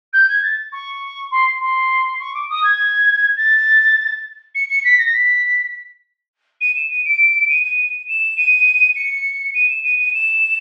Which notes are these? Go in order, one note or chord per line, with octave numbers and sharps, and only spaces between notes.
G6
G#6
A6
C#6
C6
C6
C#6
D6
D#6
G#6
A6
C#7
C#7
B6
A#6
B6
D#7
E7
D#7
D7
D#7
D#7
E7
D#7
C#7
D#7
E7
D#7
D#7
E7